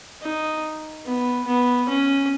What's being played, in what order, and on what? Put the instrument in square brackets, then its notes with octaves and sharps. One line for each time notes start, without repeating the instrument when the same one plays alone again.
[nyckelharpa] D#4
B3
B3
C#4